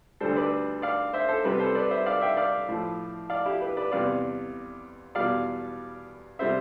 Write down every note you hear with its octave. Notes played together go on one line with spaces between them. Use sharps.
D2 D3 G3 A4 C5
B4 D5
D5 F5
C5 E5
A4 C5
C2 C3 G3 G4 B4
A4 C5
B4 D5
C5 E5
D5 F5
E5 G5
D5 F5
A2 F3
D5 F5
E4 G4
G4 B4
B4 D5
E2 C3 G3 D5 F5
E2 B2 G3 D5 F5
C3 G3 C5 E5